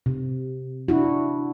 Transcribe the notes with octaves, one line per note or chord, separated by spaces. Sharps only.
C3
D4 E4 F#4